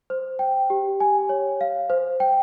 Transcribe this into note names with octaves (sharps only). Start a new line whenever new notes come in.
C5
G5
G4
G#5
C#5
F5
C5
G5